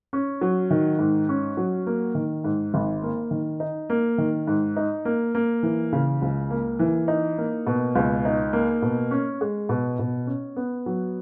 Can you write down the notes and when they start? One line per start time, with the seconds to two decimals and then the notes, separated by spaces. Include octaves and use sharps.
0.13 C#4
0.41 F#3
0.71 D#3
0.99 G#2
1.29 C#4
1.57 F#3
1.87 A#3
2.15 D#3
2.44 G#2
2.74 G#1
3.03 A#3
3.31 D#3
3.60 D#4
3.90 A#3
4.18 D#3
4.47 G#2
4.76 D#4
5.05 A#3
5.35 A#3
5.63 E3
5.93 C#3
6.22 C#2
6.50 A#3
6.79 E3
7.08 D#4
7.38 A#3
7.67 B2
7.96 C#2
8.25 D#4
8.53 A#3
8.82 B2
9.11 C#4
9.41 G#3
9.69 B2
9.99 B2
10.27 C#4
10.56 B3
10.86 F#3